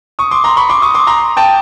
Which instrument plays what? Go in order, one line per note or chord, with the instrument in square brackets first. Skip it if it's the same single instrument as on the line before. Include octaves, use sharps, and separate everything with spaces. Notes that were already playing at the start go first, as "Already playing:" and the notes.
[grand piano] C#6 D#6
C6 D6
A#5 C6
B5 C#6
C6 D6
C#6 D#6
C6 D6
A#5 C6
G5 A5